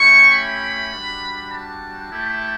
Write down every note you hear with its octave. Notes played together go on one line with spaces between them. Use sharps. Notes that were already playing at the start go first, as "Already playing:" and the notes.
Already playing: A3 C#4 E4 G4 C#6
B5
G3 D4 F#4
A5
A3 E4 G4